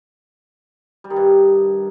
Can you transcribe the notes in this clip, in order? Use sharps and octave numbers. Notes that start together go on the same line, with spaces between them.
G3
D#3
G2